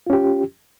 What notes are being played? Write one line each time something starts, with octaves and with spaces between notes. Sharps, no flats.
C#4 F4 G4